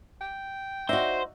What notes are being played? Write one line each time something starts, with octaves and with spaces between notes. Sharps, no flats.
G5
D#4 F#4 C5 D5 E5